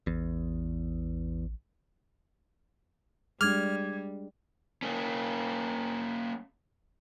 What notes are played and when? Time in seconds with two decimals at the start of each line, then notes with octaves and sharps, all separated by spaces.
0.07 A1 E2
3.41 G3 G#3 D4 D6 F6 G#6
4.82 A#3 C#4